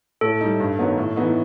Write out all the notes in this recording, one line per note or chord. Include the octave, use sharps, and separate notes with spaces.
A2 A4
G3 D#4
G2
D#3 F#3 B3 D#4
A2
E3 B3 D#4